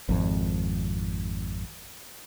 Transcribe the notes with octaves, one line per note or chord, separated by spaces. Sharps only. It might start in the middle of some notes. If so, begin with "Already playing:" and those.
G#1 F2